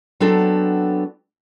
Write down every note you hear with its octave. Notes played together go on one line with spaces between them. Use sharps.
F#3 B3 C4 D4 A4